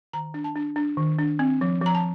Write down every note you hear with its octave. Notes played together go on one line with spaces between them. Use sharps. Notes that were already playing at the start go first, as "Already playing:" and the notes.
D#3 A#5
D4
A5
D4
D4
D#3
D4
C4
F3
F3 A#5
A5